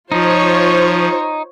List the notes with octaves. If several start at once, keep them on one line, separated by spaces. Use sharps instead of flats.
F3 D#4 F4 C5 C#5